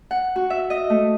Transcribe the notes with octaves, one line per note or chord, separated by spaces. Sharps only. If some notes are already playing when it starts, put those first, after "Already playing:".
F#5
F#4
E5
D#5
A3